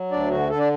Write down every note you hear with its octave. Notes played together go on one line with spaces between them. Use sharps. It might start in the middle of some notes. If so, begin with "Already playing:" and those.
Already playing: F#3
D2 D4 D5
D3 F#4
D3 A4
D4 D5